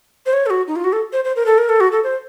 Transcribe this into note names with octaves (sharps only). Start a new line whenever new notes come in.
C5
C#5
A4
F#4
D#4
F4
F#4
A4
C5
C5
A#4
A4
A#4
A4
F#4
A4
C5